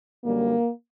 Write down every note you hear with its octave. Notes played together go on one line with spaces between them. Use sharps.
F#2 D3 G3 A#3